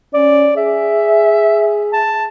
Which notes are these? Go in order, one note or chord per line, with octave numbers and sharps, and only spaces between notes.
C#4 D5
G#4 E5
A5